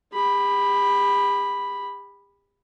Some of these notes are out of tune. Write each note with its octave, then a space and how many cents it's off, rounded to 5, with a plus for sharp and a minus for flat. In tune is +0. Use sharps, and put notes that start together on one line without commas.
G4 +45 B5 +0